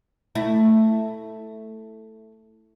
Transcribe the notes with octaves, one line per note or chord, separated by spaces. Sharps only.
A3 E4